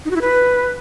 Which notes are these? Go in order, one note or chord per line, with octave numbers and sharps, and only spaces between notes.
D#4
F#4
E4
B4